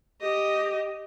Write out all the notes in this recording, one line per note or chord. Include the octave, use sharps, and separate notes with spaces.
G4 D#5